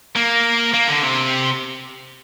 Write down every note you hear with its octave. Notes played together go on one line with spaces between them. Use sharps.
A#3
A#3
D3
C3